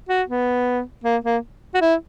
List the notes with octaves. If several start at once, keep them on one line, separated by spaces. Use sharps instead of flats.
F#4
B3
A#3
A#3
F#4
E4